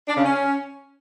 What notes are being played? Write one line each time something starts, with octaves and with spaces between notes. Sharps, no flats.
D4
C#3
C#4